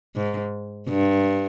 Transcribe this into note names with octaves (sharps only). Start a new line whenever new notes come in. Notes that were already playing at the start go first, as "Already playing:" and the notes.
G#2
G2